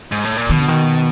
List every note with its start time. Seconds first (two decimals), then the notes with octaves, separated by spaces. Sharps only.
0.12 G#2
0.25 A2
0.37 A#2
0.49 B2 D#3
0.59 D3
0.68 D#3